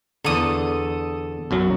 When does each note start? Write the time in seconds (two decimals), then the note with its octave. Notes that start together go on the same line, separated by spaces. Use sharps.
0.25 E2 D3 A4 D#6
1.51 B1 F#2 F#3